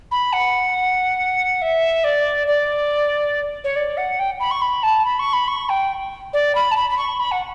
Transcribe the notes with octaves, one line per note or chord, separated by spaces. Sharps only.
B5
F#5
E5
D5
D5
C#5
D5
F#5
G5
B5
C#6
B5
A5
B5
C#6
B5
C#6
G5
D5
B5
A5
B5
B5
C#6
B5
F#5